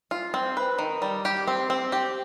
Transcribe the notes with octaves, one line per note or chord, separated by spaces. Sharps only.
F4
C4
B4
D#3
G3
G4
C4
C4
G4